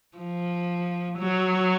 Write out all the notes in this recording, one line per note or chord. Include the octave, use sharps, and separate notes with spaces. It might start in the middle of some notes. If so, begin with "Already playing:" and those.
F3
F#3